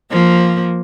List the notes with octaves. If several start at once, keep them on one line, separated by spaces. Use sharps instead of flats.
F3 A#3